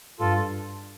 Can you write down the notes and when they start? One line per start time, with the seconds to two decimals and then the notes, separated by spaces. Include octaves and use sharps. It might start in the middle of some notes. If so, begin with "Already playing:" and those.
0.20 G2 F4 A4